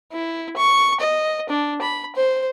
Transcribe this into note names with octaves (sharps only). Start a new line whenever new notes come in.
E4
C#6
D#5
D4
B5
C5